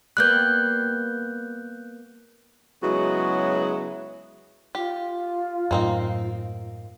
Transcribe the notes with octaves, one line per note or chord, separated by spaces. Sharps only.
G3 A#3 B3 F#6 G6
C#3 F#3 G#3 B3 E4 F#4
F4 G4
F#2 A2 A#3 C4 D#4